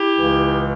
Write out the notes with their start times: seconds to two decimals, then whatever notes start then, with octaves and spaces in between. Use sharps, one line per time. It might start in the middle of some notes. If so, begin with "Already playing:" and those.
Already playing: E4 G4
0.17 C#2 C#3 E3